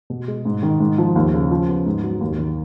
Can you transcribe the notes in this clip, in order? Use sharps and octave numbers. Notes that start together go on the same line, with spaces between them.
B2
G#3
G#2
D#3
G#2
F3
D#2
C#3
F3
B3
G#2
F#3
D#2
D#3